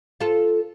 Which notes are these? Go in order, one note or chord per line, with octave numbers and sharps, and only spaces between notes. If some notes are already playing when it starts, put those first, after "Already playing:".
F4 A4